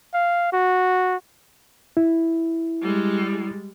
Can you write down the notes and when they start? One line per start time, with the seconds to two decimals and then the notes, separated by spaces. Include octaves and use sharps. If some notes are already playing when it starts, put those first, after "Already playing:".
0.14 F5
0.53 F#4
1.97 E4
2.82 G3 G#3